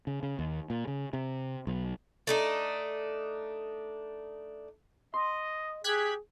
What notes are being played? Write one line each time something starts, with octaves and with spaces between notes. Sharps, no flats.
C#3
C#3
D#2
A#2
C#3
C3
B1
A3 D4 D#4
D#5 C6
G4 G#4 F#6 G#6 B6